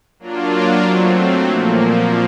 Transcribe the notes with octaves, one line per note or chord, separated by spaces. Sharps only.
F#3 A#3 D4 F4
F#3 A3 C4
A#2 F3 A#3